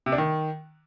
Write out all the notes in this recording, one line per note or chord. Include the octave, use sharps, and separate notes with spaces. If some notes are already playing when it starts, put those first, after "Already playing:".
C3
D4
D#3